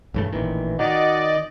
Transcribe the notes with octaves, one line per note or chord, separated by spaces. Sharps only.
E1 G2 C#3 A3
A1 A#2 D#3 E3
D#3 F#4 D5 D#5 D6